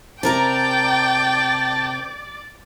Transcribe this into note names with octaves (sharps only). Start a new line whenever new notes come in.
C3 A#4 D5 G5 A5 A#5